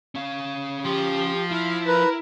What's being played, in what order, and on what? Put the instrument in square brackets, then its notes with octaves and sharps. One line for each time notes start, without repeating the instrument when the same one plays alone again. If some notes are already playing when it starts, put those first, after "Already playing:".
[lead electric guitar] C#4 F5
[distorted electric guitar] F3 F4 [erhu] G4
[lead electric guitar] E4 [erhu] F5
[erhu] A#4 [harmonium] B4